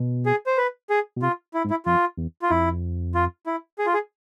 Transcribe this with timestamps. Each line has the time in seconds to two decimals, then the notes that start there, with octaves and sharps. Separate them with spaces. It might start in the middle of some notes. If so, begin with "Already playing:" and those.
Already playing: B2
0.26 G#4
0.46 C5
0.57 B4
0.90 G#4
1.16 B2
1.22 C3 F4
1.54 E4
1.65 G#2
1.70 E4
1.86 F2 F4
2.17 E2
2.42 F4
2.50 F2 E4
3.15 F4
3.46 E4
3.78 G#4
3.86 F4
3.94 G#4